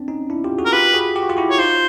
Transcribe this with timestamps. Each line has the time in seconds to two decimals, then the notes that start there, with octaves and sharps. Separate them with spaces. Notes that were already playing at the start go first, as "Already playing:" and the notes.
Already playing: C4 D4
0.08 C#4 D#4
0.30 D4 E4
0.44 F4 G4
0.58 F#4 G#4
0.66 A#4
0.72 F4 G4 B4
0.94 F#4 G#4
1.16 G4
1.23 F#4
1.29 F4 G4
1.37 E4 F#4
1.51 C#5
1.58 D#4 F4 C5